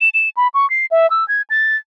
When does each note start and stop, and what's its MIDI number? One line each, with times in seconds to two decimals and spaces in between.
0.01 0.09 100
0.14 0.29 100
0.37 0.48 83
0.54 0.68 85
0.70 0.86 96
0.91 1.09 76
1.10 1.27 88
1.28 1.42 92
1.50 1.77 93